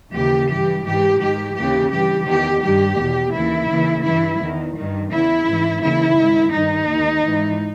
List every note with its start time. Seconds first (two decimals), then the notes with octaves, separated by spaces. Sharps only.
0.14 D#2 C#3 E3 G4
0.49 G2 E3 G4
0.84 G#2 E3 G4
1.20 G#2 D#3 G4
1.55 D#2 C#3 E3 G4
1.91 G2 E3 G4
2.27 E2 D#3 G4
2.62 G2 D#3 G4
2.97 E2 B2
3.33 D#2 C#3 E3 E4
3.69 D#2 C#3 E3
4.03 G2 E3 E4
4.40 E2 D#3
4.75 G2 D#3
5.10 E2 C#3 E3 E4
5.46 G#2 E3
5.82 D#2 C#3 E3 E4
6.17 G#2 D#3
6.52 G2 D#3 D#4
6.88 D#2 D#3
7.23 G#2 E3